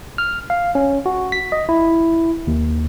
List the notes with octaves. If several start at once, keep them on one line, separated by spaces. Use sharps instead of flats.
F6
F5
C#4
F#4
B6
D#5
E4
D#2